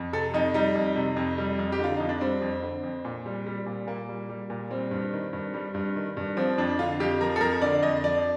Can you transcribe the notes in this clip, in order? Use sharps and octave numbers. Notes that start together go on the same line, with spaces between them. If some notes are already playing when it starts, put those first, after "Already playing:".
Already playing: F2
C3 A4
F2 D#4
G3 D#4
F2
C3
F2
G3
F2
G4
D3 F4
F2 D#4
D4
G3 C4
F2
D3
F2
A#2
G3
G3
A#2
A#2 A#3
G3
G3
A#2
G3 C4
G2
D#3
G2
G3
G2
D#3
G2
F3 C4
F2 D4
D3 F4
F2 G4
F3 A#4
A4
F2 A#4
D3 D5
F2 D#5
F3 D5